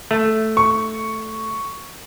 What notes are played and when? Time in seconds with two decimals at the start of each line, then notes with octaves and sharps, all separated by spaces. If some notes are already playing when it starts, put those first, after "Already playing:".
0.11 A3
0.57 C#6